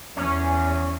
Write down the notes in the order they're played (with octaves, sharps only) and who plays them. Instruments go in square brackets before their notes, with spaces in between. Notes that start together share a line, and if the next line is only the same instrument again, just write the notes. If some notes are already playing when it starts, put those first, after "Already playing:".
[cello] E2 [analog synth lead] C#4